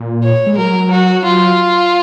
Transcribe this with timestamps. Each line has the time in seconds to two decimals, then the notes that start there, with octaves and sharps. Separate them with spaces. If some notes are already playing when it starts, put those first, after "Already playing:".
Already playing: A#2
0.24 C#5
0.46 G#3
0.57 F#3 A#4
0.91 F#4
1.25 F4